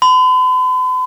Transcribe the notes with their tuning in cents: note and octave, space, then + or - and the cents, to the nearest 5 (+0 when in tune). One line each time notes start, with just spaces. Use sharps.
B5 +45